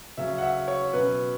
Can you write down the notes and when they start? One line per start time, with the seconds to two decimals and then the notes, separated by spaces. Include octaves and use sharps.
0.17 C#3 F#3 C#4 E5
0.38 F#5
0.42 E5
0.68 C#5
0.92 B2 F#3 C#4 B4